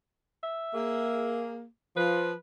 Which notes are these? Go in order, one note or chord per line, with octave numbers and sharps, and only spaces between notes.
E5
A#3 G#4
F3 B4